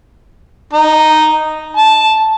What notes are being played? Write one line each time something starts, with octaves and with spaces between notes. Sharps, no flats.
D#4
A5